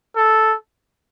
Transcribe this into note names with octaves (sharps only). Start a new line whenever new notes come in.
A4